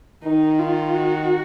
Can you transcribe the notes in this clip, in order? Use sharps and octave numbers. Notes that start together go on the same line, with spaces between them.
D#3 D#4
F4
F#4